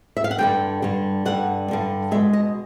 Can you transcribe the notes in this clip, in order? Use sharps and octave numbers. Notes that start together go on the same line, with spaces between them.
E5
F5
F#5
G2 D3 G3 G5
G2 D3 G3
G2 D3 G3 F#5
G2 D3 G3
B2 G#3 E5
D#5